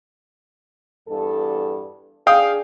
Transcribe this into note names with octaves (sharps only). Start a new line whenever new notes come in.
E2 G2 A4
D4 G#4 F5 G5 D#6